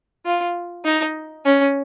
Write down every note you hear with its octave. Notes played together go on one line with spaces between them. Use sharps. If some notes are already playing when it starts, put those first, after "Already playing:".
F4
D#4
C#4